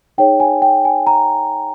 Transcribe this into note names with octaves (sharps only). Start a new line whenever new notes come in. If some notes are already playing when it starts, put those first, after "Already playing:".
D#4 G#4 C#5 G5
G#5
G5
G#5
A#5